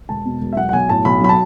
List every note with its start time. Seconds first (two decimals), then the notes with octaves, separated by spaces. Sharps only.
0.09 E1 A5
0.25 B2
0.41 E1
0.53 E5
0.57 F#3 F#5
0.69 F#5
0.73 B1 G#5
0.89 A2 A5
1.05 B1 B5
1.21 F#3 B5
1.29 A5